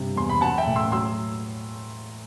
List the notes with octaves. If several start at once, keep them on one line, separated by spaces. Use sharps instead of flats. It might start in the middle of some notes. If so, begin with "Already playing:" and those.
Already playing: G2 C3
E2 C6
B5
F#3 F#5 A5
E5 G5
A2
C6 E6
F#3 C6 E6